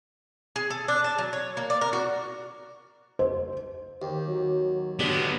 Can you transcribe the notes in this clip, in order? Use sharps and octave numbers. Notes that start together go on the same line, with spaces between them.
G#4
A4
D4
A5
F#3
C#5
A#3
D5
A#4
F#4
C5
D#2 G4
F#3
D3 B3 D4 G4 G#4